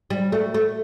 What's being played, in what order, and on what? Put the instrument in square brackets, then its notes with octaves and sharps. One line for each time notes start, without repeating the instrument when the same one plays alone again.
[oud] G3
A3
A3